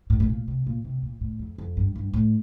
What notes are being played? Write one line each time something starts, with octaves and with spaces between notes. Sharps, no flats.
A2
A2
A#2
C3
A#2
C3
A#2
A2
F2
F2
G2
G2
A2